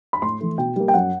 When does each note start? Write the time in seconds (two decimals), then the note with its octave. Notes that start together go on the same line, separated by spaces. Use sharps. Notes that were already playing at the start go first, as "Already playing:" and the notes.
0.13 B5
0.22 A2 C6
0.41 E3 A3
0.58 B2 G5
0.76 G3 A#3
0.88 G5
0.94 F#2 F#5